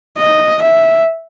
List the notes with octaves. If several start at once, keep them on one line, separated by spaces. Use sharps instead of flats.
D#5
E5